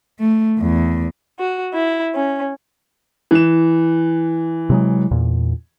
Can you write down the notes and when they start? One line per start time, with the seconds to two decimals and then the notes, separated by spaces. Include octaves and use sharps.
0.20 A3
0.59 E2
1.38 F#4
1.73 E4
2.15 C#4
3.31 E3 E7
4.70 C3 F#3 G#3
5.11 E2 A#2